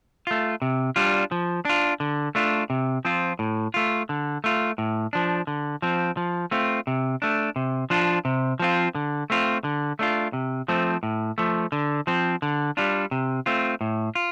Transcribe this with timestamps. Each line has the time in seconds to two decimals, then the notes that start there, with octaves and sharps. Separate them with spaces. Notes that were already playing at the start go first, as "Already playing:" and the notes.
0.27 A3 F4
0.62 C3
0.96 G3 D4 F4
1.31 F3
1.65 D4 F4
2.00 D3
2.35 A3 D4 F4
2.70 C3
3.05 F3 C4 F4
3.39 A2
3.74 A3 F4
4.09 D3
4.44 A3 F4
4.78 A2
5.13 F3 D4
5.47 D3
5.82 F3 C4
6.17 F3
6.51 A3 C4 F4
6.87 C3
7.22 A3 D4
7.56 C3
7.90 F3 D4 F4
8.25 C3
8.59 F3 C4 F4
8.95 D3
9.30 A3 C4 F4
9.64 D3
9.99 A3 D4 F4
10.33 C3
10.68 F3 A3 C4
11.03 A2
11.38 F3 A3
11.72 D3
12.07 F3 C4
12.42 D3
12.77 G3 D4 F4
13.11 C3
13.46 A3 C4 F4
13.81 A2
14.15 F4